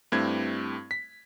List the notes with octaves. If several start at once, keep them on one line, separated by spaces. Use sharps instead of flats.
G2 A3 C4 E4 G4 G#6
B6